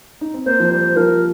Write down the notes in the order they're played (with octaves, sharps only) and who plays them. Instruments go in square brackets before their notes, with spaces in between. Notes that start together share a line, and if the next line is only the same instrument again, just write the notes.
[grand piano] D#4
C4
[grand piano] A#3 [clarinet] C5
[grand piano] F3
[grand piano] G3 [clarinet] C5
[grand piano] F3 [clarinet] A#4